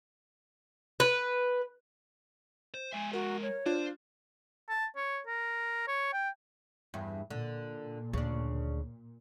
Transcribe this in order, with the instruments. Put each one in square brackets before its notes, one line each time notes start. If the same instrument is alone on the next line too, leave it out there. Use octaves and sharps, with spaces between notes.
[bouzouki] B4
[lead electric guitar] C5
[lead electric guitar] G#3 E5 [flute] G#5
[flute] F#4 [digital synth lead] A#4
[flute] C#5
[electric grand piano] D4 [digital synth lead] F4 [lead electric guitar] C5
[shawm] A5
C#5
A#4
C#5
G5
[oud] E2 G2
[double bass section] A#2 [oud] D3
[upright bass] D2 [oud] C#3 D4